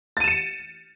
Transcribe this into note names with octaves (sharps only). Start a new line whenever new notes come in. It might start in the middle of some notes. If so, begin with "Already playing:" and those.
A6 C#7 D#7 E7